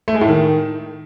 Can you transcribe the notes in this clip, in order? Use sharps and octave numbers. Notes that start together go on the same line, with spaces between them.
A3
G#3
A2
D#3